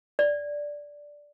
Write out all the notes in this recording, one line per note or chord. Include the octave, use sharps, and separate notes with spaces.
D5